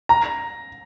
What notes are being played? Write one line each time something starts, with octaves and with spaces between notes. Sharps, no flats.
A#5